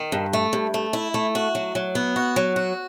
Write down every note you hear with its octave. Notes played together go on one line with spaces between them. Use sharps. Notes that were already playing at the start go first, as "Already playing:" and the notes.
Already playing: D#3
G2
A3
G2
A3
E4
A3
F#4
F#3
F#3
B3
F#4
F#3
F#4